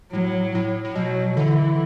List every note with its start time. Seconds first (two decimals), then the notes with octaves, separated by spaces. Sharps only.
0.12 A2 F#3
0.55 A2
0.85 A2
0.95 B2 F#3
1.37 D3 E3